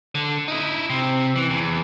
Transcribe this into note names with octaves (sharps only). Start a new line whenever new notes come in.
D3
D#4 E4
C3
E3
E2